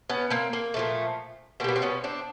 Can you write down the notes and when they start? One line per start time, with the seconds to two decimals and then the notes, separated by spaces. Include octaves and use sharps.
0.10 B3 C#4
0.30 A#3 C4
0.53 A#3
0.74 A#2 F3 A3
1.60 B2 A#3 C4
1.64 G3 B3
1.76 C4
1.82 B3 C#4
2.04 C4 D4